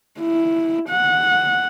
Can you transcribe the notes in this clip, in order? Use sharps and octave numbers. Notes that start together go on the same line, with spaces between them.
E4
F#5